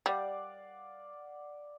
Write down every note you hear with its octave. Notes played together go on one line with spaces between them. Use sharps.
G3 D5 F5 F#5